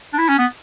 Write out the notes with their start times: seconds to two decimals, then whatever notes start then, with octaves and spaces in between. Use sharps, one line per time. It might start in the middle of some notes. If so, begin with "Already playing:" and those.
0.13 D4
0.18 E4
0.29 C#4
0.39 B3